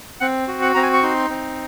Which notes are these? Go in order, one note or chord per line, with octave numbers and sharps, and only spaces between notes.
C4 F#5
F#4
F#5
C4 A#5
G#5
C#6
D#4 C6
C4